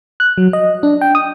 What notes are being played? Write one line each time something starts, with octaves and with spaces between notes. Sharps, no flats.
F#6
F#3
D#5
D4
G5
D#6